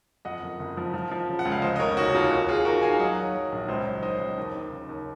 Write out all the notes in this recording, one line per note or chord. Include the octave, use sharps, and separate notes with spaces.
F2 D#5 F#5
F#1
F#1
F3
F3
F3
C#3
F#5
C#2
F5
F1 C5 D#5
D#5
C#3 A#4 C#5
D#2 F#4
D#2 F4
D#2 F#4
D#2 F4 G#4
D#2 F#4 A#4
D#3 F5 G#5
F#3 D#5 F#5
F#3
F#3
A#1
C#2 C5 D#5
F#3
D#3 C5 D#5
C#2
D#2
D#2
C#3
D#2